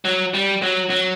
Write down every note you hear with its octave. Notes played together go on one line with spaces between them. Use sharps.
F#3
G3
F#3
F#3